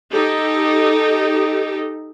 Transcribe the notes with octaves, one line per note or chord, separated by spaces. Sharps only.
D#4 G4 A4